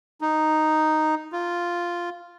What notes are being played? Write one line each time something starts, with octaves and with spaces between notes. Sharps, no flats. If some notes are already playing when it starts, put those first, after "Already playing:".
D#4
F4